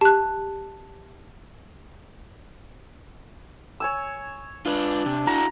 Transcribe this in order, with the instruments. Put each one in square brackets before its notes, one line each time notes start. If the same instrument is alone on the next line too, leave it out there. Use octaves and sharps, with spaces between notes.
[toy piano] G4 [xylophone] A5 F#6
[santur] C#5 G#5 E6
[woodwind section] D4 [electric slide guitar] F4 B4
[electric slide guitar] C3
[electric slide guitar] E4 F#4 [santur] A#5